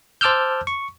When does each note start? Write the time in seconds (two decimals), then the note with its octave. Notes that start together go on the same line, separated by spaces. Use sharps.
0.21 C5 A5 D6 E6 F6 G6
0.67 C#6